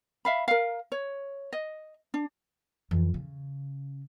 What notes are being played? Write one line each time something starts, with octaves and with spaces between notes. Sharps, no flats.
E5 F5 B5
A#4 F5
C#5
D#5
D4
F2 E3
C#3